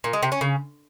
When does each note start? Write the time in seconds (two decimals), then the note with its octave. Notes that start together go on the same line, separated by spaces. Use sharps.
0.04 A#2
0.13 G#3
0.23 C3
0.32 C#4
0.41 C#3